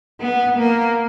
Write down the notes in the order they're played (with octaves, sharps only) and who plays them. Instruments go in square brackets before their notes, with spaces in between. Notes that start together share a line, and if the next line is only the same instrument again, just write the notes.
[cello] B3
A#3